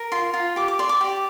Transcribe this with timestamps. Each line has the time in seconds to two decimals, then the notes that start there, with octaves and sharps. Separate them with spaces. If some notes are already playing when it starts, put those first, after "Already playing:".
Already playing: A#4
0.12 F4 C6
0.34 F4
0.56 G4 D6
0.68 D6
0.79 D5 C6
0.89 D6
1.01 G4